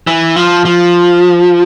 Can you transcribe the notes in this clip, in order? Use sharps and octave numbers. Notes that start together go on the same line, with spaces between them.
E3
F3
F3